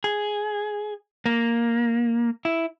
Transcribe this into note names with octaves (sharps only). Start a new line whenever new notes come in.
G#4
A#3
E4